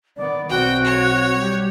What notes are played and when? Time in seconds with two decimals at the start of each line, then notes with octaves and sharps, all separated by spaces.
0.17 D#3 B3 D5
0.50 B1 C4 F#4 G5
0.85 C#5
1.39 G3 G4